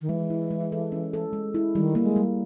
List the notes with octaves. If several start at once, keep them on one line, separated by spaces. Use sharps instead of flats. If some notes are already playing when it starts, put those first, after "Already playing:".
D#3
E3 G#3
E4
G#3
A4
C#4
A4
G#3
E4
D#3 G3
A#3
G#3
G3